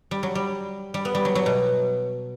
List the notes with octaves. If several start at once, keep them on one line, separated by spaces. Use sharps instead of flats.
G3
F#3
G3
G3
B3
G3
F#3
F#3
B2